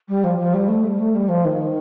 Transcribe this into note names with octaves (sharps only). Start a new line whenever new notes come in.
G3
F3
F3
G3
A3
G3
A3
G3
F3
D#3